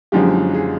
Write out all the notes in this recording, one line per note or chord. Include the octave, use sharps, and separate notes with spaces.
F#1 F#2 D3 F3 G#3 G4
G#4